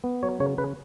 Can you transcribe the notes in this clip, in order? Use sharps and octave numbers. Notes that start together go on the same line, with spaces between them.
B3
F#3 C#5
C#3 C#5
C#3 B4